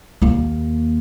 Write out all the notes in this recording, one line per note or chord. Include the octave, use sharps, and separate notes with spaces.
D#2 A#3